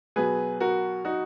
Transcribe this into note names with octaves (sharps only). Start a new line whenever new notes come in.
B2 F#3 B3 G#4 B4
F#4 A#4
D#4 F#4